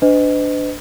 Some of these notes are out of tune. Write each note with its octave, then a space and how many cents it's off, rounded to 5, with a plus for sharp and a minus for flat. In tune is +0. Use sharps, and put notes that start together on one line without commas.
D4 +0 B4 +45 D#5 +0